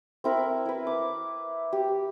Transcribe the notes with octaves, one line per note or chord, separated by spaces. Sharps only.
C4 E4 A#4
E4 B4
D6
G4